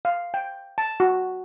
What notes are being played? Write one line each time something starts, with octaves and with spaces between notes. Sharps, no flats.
F5
G5
A5
F#4